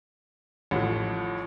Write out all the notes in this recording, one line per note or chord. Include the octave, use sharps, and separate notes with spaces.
A1 A2 F3